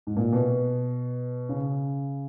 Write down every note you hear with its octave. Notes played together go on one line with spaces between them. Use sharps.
G#2
A#2
B2
C#3